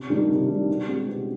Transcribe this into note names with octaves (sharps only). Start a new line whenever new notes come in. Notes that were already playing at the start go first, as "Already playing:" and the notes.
Already playing: C3
D#3 G3 D4 G4
C3
D#3 G3 D4 G4
B2
G#3 C4 G4
B2